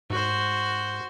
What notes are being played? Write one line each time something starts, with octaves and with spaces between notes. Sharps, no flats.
G#2 F#4 C5